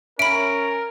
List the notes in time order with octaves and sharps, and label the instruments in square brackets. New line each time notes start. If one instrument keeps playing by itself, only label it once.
[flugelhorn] C#4 [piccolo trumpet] A#4 [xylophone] E5 B5 [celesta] D7